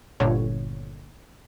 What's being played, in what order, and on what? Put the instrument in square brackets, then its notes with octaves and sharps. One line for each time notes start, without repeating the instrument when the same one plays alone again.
[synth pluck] G1 A#2 D3 C#5